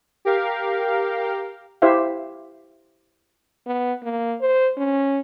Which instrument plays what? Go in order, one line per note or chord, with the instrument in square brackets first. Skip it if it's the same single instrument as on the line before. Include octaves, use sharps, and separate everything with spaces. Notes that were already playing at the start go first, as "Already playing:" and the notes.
[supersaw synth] G4 A#4 F5
[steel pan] E4 G4 C5 E5 F5
[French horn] B3
A#3
C5
C#4